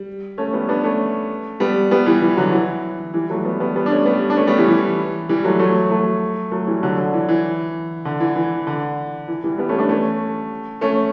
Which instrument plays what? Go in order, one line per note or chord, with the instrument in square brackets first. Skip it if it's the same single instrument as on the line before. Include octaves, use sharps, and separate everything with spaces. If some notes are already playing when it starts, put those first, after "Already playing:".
Already playing: [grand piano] G3
A3 C#4
G3 B3
B3 D4
A3 C#4
G3 B3
G3 B3
E3 G3
E3
D3 F#3
E3
E3 G3
F#3 A3
G3 B3
G3 B3
G3 B3
D4
A3 C#4
G3 B3
D4
A3 C#4
G3 B3
E3 G3
E3
E3 G3
F#3 A3
F#3 A3
F#3 A3
F#3 A3
E3 G3
D3 F#3
D3
E3
E3
D3
E3
E3
D3
E3
E3 G3
G3 B3
A3 C#4
B3 D4
A3 C#4
A3 C#4